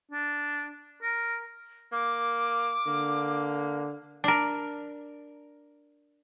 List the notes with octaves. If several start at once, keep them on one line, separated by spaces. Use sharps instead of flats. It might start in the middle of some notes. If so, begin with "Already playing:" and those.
D4
A#4
A#3 D6
D3 A#3
D4 A#4